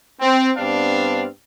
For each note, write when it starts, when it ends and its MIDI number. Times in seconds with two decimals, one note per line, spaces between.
0.20 0.50 60
0.56 1.24 43
0.56 1.24 59
0.56 1.24 60
0.56 1.24 62
0.56 1.24 77